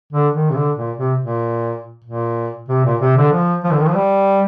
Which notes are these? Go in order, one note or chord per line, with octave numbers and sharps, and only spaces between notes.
D3
D#3
C3
D3
A#2
C3
A#2
A#2
C3
A#2
C3
D3
F3
F3
D3
D#3
F3
G3